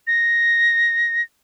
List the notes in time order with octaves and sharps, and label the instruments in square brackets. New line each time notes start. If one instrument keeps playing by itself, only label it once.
[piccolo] A#6